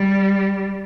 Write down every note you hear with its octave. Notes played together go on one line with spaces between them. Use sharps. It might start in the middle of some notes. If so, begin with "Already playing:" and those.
Already playing: G3